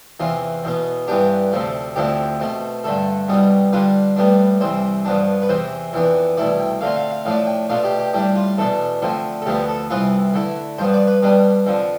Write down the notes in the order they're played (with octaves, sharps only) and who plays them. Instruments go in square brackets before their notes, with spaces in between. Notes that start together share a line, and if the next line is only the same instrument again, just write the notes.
[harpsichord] E2 C3 E3 F4
E2 B2 B3
G2 E3 B3 D4 G4
D2 C3 F3 A3
D2 D3 F3 C4 E4 G4
B2 A3 C4
G2 D3 A3 A4
C2 B2 G3 B3
D3 G3 D4 F4 B4
A2 G3 B3 D4
C2 C3 E3 C5
G2 F3 B3 D4
B4
E2 C3 E3 C5
F2 E3 B3 D4
C2 B2 A3 E4 D5
G5
D3 A3 C4 F4 F5
F5
F5
A2 F3 A3 D4 F5
G5
B2 A3 D4 F4 F5
G4
G4
A2 G3 D4 G4
F4
E2 B2 A3 D4 A4
D3 F3 A3 C4
A4
D2 D3 F3 B3 G4
A4
C2 C3 E3 B3 F4 B4
D3 A3 E4
G2 F3 B3 C5
D5
B4
B2 G3 D4 B4
F2 D3 F3